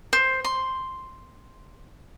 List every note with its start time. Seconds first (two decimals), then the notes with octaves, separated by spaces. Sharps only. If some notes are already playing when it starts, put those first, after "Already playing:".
0.13 C5
0.44 C6